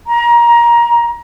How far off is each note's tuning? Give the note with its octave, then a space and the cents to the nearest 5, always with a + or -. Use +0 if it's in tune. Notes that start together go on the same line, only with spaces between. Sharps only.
A#5 +20